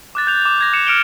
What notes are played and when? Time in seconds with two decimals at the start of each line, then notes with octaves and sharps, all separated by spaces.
0.15 D6 F#6 A6
0.27 G6 F7
0.42 D6 F7
0.61 G#6 A#6
0.73 F#6 G#6 C#7 E7 F7
0.87 F6 C#7 D7 F7 G7